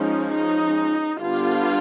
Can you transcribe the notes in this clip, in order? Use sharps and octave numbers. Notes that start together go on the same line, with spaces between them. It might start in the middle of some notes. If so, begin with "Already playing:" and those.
Already playing: F3 G#3 C#4 D#4
D#4
D3 G3 B3 D4 F4